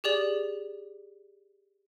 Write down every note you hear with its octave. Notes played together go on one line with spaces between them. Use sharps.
G4 G#4 D5 F#7